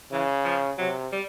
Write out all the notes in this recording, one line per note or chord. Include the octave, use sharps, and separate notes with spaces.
C#3 E3
F3
C3 F#3
G3